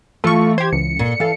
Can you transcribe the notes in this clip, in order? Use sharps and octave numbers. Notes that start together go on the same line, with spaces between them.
E3 A3 F4 A4 C#6
G4 C5 G#6
C#2 C#7
A#2
E3 A4 F5